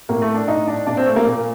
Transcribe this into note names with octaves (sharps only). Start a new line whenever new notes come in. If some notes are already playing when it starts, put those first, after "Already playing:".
A2 A#3
A3
D4
A2 D#4
D4
A#2 D4
C4
A3
A#3
A#2